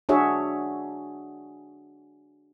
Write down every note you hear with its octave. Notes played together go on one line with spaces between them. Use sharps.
D4 F#4 G#4 C#5 E5